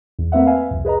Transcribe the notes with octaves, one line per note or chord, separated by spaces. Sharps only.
E2
A3 A#3 C4 B4 E5 F#5
B4 E5 F5 G#5
C2 F2
G#4 B4 D#5 A#5